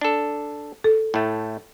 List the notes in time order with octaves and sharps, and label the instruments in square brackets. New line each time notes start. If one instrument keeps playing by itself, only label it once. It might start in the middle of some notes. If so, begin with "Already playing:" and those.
[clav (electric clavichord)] D4 A4
[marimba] A4
[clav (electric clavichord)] A2 A3